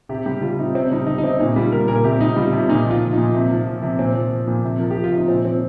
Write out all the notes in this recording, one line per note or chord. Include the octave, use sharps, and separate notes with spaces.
C3 G4
G3 G4
G3 F4
C3 D#4
C3 C4
G3 D#4
G3 D#4
D#4
C3 C4
A#2 D#4
G3 F4
G3 A#4
A#2 A#4
C3 G4
G3 D#4
G3 F4
C3
A#2 D#4
F3 F4
F3
A#2 D#4
C3
F3
F3
C3
A#2 C4
F3
F3
A#2
C3
F3 A#4
G4
F3
F4
C3 D#4
A#2 C4
F3 C4